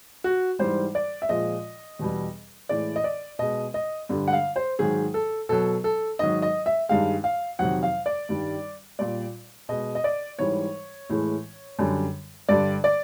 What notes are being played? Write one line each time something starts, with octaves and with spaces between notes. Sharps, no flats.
F#4
G#2 E3 G3 C5
D5
E5
A#2 F3 G#3 D#5
E2 B2 G3
A2 E3 G#3 D5
D#5
D5
B2 G#3 D#5
D#5
G2 D3 G3
F#5
F5
C5
G#2 D#3 F#3 G#4
A4
B2 F#3 A4
A4
G#2 D#3 F#3 D#5
D#5
E5
G2 D#3 G#3 F5
F5
F2 C3 D#3 F#3 F#5
F5
D5
G2 D#3 G3
A#2 G3 D5
B2 G#3 D#5
D#5
D5
G#2 E3 G3 C#5
A2 E3 G#3
F#2 D3 G3
G2 D3 G3 D5
D5